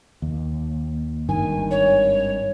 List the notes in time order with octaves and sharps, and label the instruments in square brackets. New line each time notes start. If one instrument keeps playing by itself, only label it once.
[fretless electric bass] D#2
[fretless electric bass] G#1 G2 D#3 [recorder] G#5
[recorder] C#5